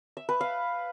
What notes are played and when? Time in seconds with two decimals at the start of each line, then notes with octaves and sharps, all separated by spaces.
0.17 E5
0.29 B4
0.41 F5